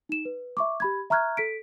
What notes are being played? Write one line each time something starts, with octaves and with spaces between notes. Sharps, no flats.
D#4 E7
B4
E5 C#6 D6
G4 B5 G#6
E5 A#5 C#6 F6 F#6 G#6
A4 B6 D7